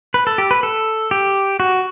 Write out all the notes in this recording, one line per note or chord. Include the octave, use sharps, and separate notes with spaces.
B4
A4
G4
B4
A4
G4
F#4